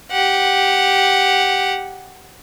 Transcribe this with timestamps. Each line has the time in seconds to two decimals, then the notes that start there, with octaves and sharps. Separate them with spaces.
0.11 G4 F#5